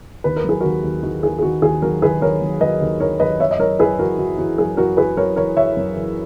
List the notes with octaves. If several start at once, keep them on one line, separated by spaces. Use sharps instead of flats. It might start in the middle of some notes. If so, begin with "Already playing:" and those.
D#2 B4
A#4
F#3 G#4
D#2 F#4 A#4
D#2
D#3 F#4
D#2 G#4
G#4
D#3 F#4
D#2 G#4
F#3 F#4 A#4
D#3 G#4 B4
F#3 A#4 C#5
F#3
F#3 B4 D#5
D#2
D#3 A#4 C#5
F#3 B4 D#5
F#2 C#5 E5
D#5
F#2 A#4 C#5
F#2 G#4 B4
E3 F#4 A#4
E3 F#4
E3 F#4
F#2 G#4
F#2 F#4 A#4
E3 G#4 B4
F#2 A#4 C#5
E3 A#4 C#5
E3 C#5 E5
F#2
E3